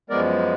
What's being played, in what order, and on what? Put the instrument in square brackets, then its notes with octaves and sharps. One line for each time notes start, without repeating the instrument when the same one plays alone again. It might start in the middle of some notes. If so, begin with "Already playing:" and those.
[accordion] F#2 F3 G#3 B3 A#4 D5